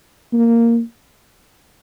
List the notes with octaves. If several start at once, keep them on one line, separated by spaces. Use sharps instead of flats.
A#3